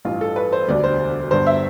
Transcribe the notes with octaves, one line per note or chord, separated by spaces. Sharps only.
A1 G2 E3 F4
A4
B4
C5
E1 D2 D3 G3 D5
C5
G1 G2 D3 C5
E5